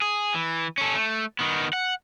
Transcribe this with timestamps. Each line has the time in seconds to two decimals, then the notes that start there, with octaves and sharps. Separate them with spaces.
0.02 G#4
0.34 E3
0.78 C#4 A4
0.95 A3
1.39 D#3 B3
1.73 F#5